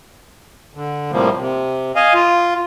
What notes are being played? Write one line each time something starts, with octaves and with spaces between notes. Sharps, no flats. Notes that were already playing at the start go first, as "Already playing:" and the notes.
D3
A2 C3 F3 G3 A#3
C3
D#5 F5 G#5
F4